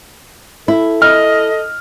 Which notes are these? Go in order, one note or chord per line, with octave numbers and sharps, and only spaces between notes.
E4 A4
D#5 F6